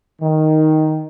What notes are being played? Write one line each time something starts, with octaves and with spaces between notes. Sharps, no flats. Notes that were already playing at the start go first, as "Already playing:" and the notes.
D#3